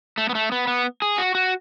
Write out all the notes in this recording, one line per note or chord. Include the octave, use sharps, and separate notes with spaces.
A3
B3
A3
B3
B3
G#4
F#4
F#4